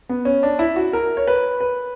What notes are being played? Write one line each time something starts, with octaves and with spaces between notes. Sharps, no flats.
B3
C#4
D4
E4
F#4
A#4
C#5
B4
B4